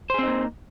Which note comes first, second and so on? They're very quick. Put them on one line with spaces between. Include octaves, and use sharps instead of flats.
C5 G#4 C4 D#4 A#3